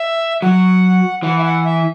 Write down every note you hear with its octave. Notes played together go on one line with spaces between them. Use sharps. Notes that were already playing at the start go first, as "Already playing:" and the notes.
Already playing: E5
F#3 F#5
E3 F#5
E5
F#5
E5